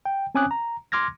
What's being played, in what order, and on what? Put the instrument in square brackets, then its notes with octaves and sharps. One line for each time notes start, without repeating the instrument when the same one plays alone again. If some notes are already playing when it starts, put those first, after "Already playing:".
[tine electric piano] G5
C4 C#4 G#5 D6 D#6 F#6
A#5
C6 D6 F6 G#6 A#6